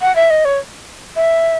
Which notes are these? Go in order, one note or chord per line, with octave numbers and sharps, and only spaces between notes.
F#5
E5
D#5
C#5
E5